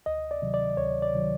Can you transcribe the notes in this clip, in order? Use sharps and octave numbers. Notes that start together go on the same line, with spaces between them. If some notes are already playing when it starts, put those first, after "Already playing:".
D2 D#5
D5
C3 D#3 F#3
D5
D2 C#5
D5
C3 D#3 F#3